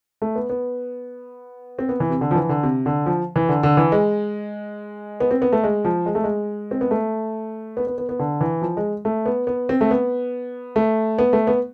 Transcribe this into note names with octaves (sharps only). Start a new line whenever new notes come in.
A3
B3
B3
C4
B3
E3
C3
D3
F3
E3
D3
C3
D3
F3
E3
D3
D3
E3
G#3
B3
C4
B3
A3
G#3
F3
G#3
A3
G#3
C4
B3
A3
B3
B3
B3
B3
D3
E3
F3
G#3
A3
B3
B3
C4
A3
B3
A3
B3
A3
B3